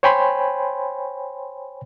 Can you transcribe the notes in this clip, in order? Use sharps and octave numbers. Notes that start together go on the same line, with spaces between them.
C5 C#5 G5 G#5 B5 C6